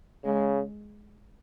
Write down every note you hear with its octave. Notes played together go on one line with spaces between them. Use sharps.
C#3 G#3